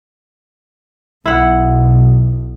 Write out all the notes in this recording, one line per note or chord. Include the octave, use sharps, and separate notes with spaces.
B1 E4 F#5